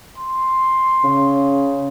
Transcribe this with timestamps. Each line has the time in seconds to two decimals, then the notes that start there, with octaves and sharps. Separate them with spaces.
0.18 C6
1.04 C#3